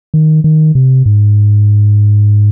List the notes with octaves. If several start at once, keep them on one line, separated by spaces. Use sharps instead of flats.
D#3
D#3
C3
G#2